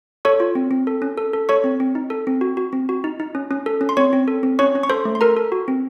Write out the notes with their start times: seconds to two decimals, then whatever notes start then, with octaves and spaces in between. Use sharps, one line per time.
0.25 A4 C#5 C#6
0.40 F4
0.55 C4
0.71 C4
0.87 A4
1.02 C#4
1.17 A4
1.33 A4
1.49 A4 C#5 C#6
1.64 C4
1.80 C4
1.95 D#4
2.10 A4
2.27 C4
2.41 F#4
2.57 F#4
2.73 C4
2.89 F#4
3.04 D#4
3.20 D#4
3.35 C#4
3.51 C#4
3.66 A4
3.81 C#4
3.89 C6
3.97 C4 C#5 C#6
4.13 C4
4.28 A4
4.43 C4
4.59 C#4 C#5 C#6
4.75 C#4
4.83 C#6
4.90 A4 C5 C6
5.05 A3
5.15 C6
5.21 A4 A#4 A#5
5.37 A4
5.52 F#4
5.68 C4